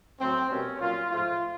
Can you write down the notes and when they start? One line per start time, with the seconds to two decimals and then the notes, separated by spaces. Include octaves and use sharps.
0.20 A2 F#3 A3 C4
0.50 B2 G3 A#3 C#4
0.80 A#2 F#3 A#3 F4
1.10 G#2 F3 A3 F4